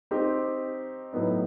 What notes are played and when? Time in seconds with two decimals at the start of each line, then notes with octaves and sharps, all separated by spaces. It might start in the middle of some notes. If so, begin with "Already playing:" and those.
0.11 C4 D#4 G4
1.13 A2 F#3 B3 D#4